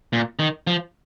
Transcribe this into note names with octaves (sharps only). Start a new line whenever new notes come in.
A#2
D#3
F3